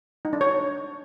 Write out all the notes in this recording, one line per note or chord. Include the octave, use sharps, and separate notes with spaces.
D#4
D4
C#5